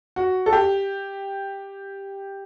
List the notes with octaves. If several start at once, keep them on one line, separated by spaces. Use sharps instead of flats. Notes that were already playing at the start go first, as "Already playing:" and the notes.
F#4
A4
G4